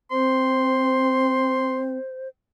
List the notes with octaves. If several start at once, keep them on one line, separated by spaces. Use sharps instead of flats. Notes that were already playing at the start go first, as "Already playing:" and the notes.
C4 C5 C6